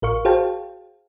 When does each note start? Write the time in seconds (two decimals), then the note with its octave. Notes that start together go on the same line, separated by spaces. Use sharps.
0.02 A1 A#4 F5 C#6
0.25 F#4 G#4 C5 F5 G5 A5